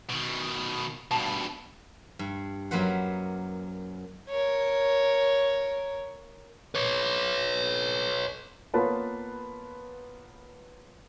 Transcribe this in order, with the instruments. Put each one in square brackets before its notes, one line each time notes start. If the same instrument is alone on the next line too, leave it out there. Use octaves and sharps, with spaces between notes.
[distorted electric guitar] B2 D#3
[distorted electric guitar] G2 B2 [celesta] A5
[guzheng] G2
F#2 F#3 A#3 B4 C5 F#5
[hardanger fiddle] A#4 C#5
[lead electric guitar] B4 C#5
[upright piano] A#3 B3 F4 B4 C#5 A5